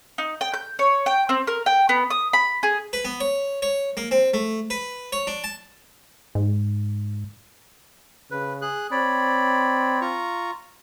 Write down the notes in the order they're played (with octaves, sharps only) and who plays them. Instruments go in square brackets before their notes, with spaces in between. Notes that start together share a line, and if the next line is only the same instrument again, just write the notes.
[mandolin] D#4
G5
G6
C#5
G5
C4
A#4
G5
B3
D#6
B5
G#4
[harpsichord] B4
B3
C#5
C#5
A#3
C4
A3
B4
C#5
D4
A5
[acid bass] G#2
[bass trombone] C#3 [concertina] B4
[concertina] G#4 F#6
[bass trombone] C4 [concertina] C#5 D5 B5
[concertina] F4 A#5 C#6